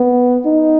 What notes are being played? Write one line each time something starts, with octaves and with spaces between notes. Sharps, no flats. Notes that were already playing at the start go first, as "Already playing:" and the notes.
Already playing: B3
D#4